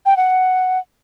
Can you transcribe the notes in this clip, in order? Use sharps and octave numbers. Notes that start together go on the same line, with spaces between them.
G5
F#5